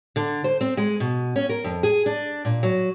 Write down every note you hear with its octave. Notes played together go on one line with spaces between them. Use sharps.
D3
C5
C4
G#3
B2
C#4
A#4
F2
G#4
D4
A#2
F#3